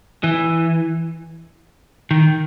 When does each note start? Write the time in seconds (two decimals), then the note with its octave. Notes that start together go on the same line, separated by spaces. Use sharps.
0.24 E3
2.11 D#3